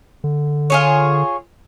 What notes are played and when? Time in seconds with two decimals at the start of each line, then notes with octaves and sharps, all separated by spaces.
0.24 D3
0.70 F4 G#4 C#5